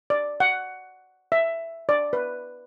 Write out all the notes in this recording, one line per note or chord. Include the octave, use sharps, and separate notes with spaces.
D5
F#5
E5
D5
B4